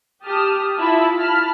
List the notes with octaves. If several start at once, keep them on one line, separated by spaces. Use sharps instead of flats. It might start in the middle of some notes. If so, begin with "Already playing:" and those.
G4 A5 D#6 F6
E4 F4 E5 A5 B5
A5 B5 F6